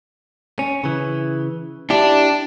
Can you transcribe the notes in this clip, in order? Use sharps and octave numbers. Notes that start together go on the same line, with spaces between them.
C#4
C#3 E3
D4 E4 G4